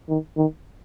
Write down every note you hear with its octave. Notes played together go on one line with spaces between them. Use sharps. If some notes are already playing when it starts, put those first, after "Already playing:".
D#3
D#3